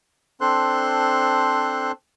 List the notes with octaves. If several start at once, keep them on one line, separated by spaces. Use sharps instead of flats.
C4 D4 A4 C5 C6 F#6